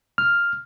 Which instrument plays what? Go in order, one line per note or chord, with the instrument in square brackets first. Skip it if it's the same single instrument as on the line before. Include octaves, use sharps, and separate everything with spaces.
[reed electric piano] F6